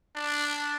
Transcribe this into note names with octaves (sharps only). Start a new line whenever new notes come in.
D4